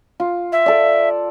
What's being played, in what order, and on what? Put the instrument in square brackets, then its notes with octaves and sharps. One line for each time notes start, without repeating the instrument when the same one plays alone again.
[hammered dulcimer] F4
[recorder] E5
[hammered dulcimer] A4 D5